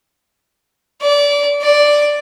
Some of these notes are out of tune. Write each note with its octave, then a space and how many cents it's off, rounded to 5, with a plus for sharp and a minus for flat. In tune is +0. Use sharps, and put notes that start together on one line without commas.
D5 -25
D5 +0